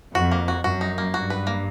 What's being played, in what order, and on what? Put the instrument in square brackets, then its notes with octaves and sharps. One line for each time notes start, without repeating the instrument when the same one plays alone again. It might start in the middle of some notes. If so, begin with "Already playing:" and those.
[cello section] F2 [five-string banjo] F#4
[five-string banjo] A#3
F#4
[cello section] F#2 [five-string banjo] F#4
[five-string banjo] D#4
A#3
[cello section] G2 [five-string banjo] F#4
[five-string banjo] B4
A#3